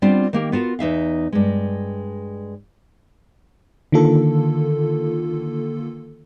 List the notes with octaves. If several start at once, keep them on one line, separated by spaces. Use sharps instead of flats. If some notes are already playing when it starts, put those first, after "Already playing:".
G3 B3 C4 D4 F4 G4
D#3 A#3 G4
B3 F4 F#4 A#4
E2 D#4 E5 F5
G2 G#3
D3 D#3 A#3 F4 A4